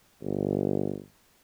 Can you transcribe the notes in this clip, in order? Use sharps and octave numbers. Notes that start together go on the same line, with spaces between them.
G1